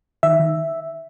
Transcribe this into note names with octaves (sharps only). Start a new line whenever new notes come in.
D#3 E5
D#3